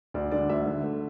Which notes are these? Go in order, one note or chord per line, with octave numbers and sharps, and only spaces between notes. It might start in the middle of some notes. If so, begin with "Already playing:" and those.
D2 D5
D3 D5
D2 E5
D3
A3